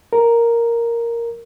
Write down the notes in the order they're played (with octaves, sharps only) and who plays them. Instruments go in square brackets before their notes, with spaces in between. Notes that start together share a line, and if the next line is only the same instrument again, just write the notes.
[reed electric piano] A#4